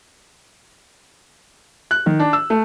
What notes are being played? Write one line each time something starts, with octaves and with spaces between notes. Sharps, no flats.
F#6
D#3
D4
E6
A3